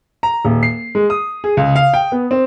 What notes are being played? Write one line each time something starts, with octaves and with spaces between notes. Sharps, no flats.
A#5
D#1
C7
G#3
D#6
G#4
C#2
F5
G5
B3
C4